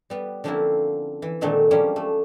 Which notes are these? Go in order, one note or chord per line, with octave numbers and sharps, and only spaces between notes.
G3 B3
D3 F3 A#3 C4 C#4 E4
E3
A#2 D3 D#3 G#3 A3 C4
F3 G3 G#3 A#3 C#4
A3